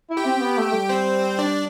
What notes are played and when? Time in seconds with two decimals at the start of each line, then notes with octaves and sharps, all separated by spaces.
0.10 E4
0.17 G4 G5
0.25 C4
0.37 C4
0.41 B3
0.58 A3
0.73 G3
0.89 C4 C5
1.39 D4 D5